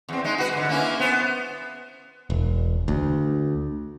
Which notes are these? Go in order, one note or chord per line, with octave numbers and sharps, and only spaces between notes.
E2 C4
G#3 D#4
F#4 B4
G#2 D3
A#3 C#4 E4
B3 C5
E1
D2